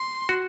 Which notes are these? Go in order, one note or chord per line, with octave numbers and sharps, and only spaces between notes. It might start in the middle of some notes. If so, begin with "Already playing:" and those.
Already playing: C6
F#4